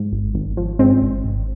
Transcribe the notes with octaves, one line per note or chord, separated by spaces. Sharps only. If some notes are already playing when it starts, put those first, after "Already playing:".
Already playing: G#2
G#1
G#1
F3
G#2 G#3 C4
G#1
G#1